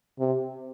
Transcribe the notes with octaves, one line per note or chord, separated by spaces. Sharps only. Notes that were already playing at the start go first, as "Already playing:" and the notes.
C3